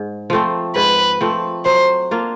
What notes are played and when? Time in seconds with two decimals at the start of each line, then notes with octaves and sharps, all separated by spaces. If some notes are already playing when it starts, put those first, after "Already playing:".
Already playing: G#2
0.30 F3 A3 C4
0.76 G#2 B4
1.21 F3 A3 C4
1.65 F#3 C5
2.11 A#3 D4 F4